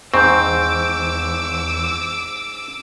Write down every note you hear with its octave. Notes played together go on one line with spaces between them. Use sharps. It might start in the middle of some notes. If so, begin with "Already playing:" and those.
E2 G#2 C4 C#6 D6 E6 G6